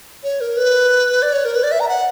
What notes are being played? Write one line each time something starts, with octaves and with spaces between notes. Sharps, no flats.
C#5
A#4
B4
D5
C#5
A#4
B4
D5
E5
A#5
F#5